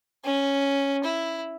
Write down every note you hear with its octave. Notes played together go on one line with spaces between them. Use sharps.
C#4
E4